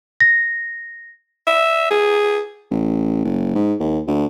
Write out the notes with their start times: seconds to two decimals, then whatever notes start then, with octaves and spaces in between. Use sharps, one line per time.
0.20 A#6
1.47 E5
1.91 G#4
2.71 A1
3.25 F#1
3.55 G#2
3.80 D#2
4.07 D2